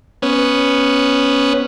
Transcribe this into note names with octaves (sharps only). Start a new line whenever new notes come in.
B3 C#4